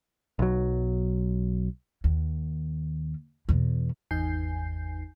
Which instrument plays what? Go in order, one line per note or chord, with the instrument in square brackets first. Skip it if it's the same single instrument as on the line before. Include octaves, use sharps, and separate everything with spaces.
[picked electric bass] B1 F#3
[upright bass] D#2
E2 B2
[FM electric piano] G#1 E2 D#4 G#5 G6 C7